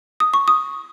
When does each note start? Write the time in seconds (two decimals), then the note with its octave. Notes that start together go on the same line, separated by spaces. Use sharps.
0.20 D#6
0.34 C#6
0.48 D#6